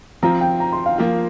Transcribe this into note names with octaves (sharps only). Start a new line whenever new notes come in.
F3 C4 F4 A#5
G5
A#5
C6
F5
F3 A#3 F4